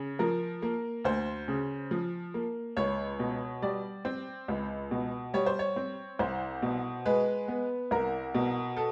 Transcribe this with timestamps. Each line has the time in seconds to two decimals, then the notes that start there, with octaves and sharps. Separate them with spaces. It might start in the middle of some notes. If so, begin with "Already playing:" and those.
Already playing: C#3
0.19 F3 A#4
0.62 A#3
1.04 D2 C5
1.48 C#3
1.91 F3
2.34 A#3
2.77 C#2 C#5
3.19 B2
3.62 G3 D5
4.05 C4
4.48 C#2
4.91 B2
5.34 G3 C#5
5.46 C5
5.59 C#5
5.76 C4
6.19 C2 C5
6.62 B2
7.06 G#3 B4
7.48 B3
7.91 C2 A#4
8.34 B2
8.77 A4